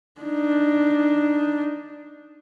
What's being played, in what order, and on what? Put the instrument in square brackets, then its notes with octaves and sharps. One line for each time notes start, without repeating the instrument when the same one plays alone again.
[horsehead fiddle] D4 D#4